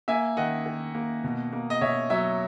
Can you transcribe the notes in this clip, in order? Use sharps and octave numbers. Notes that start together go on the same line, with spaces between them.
A#3 E5 G#5
D#3 D#5 F#5
D#3
A#3
B2
A#3
D#5
B2 C#5 E5
F#3 C#5 E5